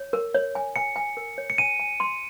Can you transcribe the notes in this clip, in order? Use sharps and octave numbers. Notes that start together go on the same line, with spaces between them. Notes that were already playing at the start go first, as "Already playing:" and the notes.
Already playing: C#5
A#4
C#5
G#5
G#5 C#7
G#5
A#4
C#5
C#7
G#5 D#7
G#5
C6